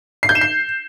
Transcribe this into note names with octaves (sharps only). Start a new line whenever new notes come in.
C7
G6
E7
C7